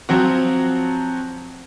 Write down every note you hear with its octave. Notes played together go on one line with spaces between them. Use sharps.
F3 F#3 C4 F#4